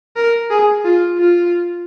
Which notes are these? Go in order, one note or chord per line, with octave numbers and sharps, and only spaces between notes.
A#4
G#4
F4
F4